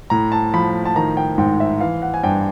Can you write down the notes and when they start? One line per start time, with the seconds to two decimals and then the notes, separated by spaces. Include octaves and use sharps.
0.10 A2 A#5
0.32 A5
0.53 F3 B5
0.85 A5
0.96 D#3 A#5
1.17 G5
1.38 G#2 G5
1.60 E5
1.80 E3 F5
2.02 F#5
2.14 G#5
2.23 G2 G5